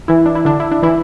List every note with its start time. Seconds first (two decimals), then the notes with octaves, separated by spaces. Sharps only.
0.08 E3 E4
0.26 D4
0.35 E4
0.45 D3 D4
0.60 E4
0.71 D4
0.83 E3 E4